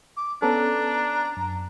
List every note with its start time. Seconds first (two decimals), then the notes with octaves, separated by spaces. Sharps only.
0.17 D6
0.42 B3 C#4 D4 A4 A#5
1.37 F#2